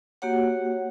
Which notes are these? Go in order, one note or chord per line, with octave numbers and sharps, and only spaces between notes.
A#3 F#4 G4 C#5 F#5